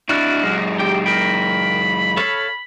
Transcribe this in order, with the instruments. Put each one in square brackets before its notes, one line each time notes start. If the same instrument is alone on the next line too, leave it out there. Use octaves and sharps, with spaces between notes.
[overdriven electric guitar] D4 E4 [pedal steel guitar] F#4 F6
[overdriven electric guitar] F#2 G#3
[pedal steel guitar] G4 G5
[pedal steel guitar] A#4 G5 [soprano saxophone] B5
[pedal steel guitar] A4 C#5 F5